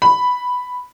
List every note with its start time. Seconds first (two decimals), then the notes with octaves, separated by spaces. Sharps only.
0.02 B5